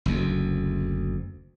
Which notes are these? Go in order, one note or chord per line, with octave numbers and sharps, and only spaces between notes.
F#1 D2